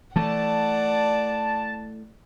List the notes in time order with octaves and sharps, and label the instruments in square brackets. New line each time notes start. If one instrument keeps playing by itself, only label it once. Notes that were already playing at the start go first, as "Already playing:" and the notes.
[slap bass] E3 A3 [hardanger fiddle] D5 F#5 [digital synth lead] A5